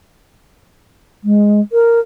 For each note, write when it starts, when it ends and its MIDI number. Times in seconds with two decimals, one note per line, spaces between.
1.23 1.60 56
1.72 1.99 70